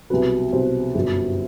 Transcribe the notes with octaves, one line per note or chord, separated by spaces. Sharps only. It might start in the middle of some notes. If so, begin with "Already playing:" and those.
C2 B2 F#3 B4
C2 B2 F#3 C5
G1 F#2 F#3